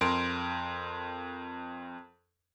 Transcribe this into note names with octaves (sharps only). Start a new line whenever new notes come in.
F2 A#4 C6 D7